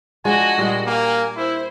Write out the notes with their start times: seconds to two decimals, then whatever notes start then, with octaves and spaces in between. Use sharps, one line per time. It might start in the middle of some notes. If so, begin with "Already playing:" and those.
0.25 F3 G#3 D4 F#4 D#5 G#5
0.58 A#2 G3 G#3
0.86 A#3 G#5
1.36 E4 C5